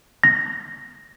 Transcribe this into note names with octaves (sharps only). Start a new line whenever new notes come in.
A#6